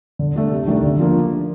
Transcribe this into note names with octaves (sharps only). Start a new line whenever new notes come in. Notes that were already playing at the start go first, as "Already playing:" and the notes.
D3
A3 D4
C3
D#3 A3 D4
D3
F3 A#3 D4